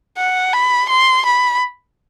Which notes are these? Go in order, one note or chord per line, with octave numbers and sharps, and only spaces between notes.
F#5
B5
C6
B5